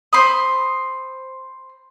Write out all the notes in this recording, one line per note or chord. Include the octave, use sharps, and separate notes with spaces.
C5 B5 D#6